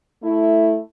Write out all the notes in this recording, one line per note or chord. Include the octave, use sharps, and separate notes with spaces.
A3 E4